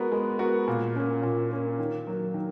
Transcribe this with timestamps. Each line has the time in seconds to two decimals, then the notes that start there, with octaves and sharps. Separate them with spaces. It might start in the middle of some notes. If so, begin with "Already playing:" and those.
Already playing: G#3 B3 F#4 A#4
0.12 G#3
0.39 B3 F#4 A#4
0.68 A#2
0.95 A#3 C#4
1.23 A#2
1.51 A#3 C#4
1.79 D#3
2.07 F#3 A#3
2.34 D#3